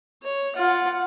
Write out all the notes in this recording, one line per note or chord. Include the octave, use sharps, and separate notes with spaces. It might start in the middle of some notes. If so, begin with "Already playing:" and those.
C#5
F4 F#5